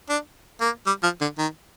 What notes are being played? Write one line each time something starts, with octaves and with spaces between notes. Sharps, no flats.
D4
A#3
G3
F3
D3
D#3